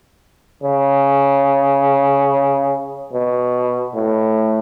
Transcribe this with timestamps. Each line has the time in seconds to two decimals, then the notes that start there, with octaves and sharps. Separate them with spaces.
0.63 C#3
3.13 B2
3.95 A2